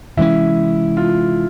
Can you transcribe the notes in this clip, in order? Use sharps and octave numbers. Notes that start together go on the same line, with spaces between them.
C3 E3 G#3 C#4 E4
F4